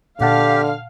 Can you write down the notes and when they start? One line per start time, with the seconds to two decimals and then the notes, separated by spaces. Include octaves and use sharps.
0.21 A#2 D3 G4 F5 F#5 A5